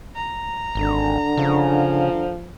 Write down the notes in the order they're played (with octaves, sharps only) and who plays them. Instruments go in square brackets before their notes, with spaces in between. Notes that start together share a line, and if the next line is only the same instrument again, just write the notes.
[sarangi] A#5
[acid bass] G#1 [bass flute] D3
[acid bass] C#3 [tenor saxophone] F3